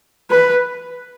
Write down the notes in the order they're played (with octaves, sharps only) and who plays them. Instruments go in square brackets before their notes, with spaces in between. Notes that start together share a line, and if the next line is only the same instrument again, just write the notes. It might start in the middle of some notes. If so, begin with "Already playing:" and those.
[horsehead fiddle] B4